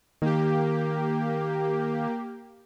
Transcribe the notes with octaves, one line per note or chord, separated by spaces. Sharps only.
D#3 A#3 G4